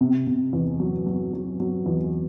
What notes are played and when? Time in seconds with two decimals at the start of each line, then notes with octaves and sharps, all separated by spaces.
0.01 C3
0.27 C3
0.53 E2
0.80 F#3
1.06 F#3
1.33 F#3
1.60 F#3
1.86 E2